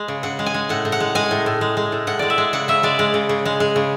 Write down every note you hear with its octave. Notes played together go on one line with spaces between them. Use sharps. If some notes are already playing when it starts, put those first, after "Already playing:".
Already playing: G#3
C#3
C#3 F#5
G#3
G#5
G#3
A2 F#5
A2
F#5
G#3
G#3 G#5
A2
A2
G#3
G#3
A2
A2 F#5
G#3 D5
E5
G#3
C#3 F#5
C#3 E5
G#3 D5
G#3
C#3
C#3
G#3
G#3
C#3